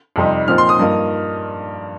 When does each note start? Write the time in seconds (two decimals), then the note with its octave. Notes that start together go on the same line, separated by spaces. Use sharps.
0.16 F2 C3 G3 D#4
0.48 A#2 F3 C4 D#4 F6
0.58 C6
0.69 D#6
0.79 G2 F3 A#3 D#4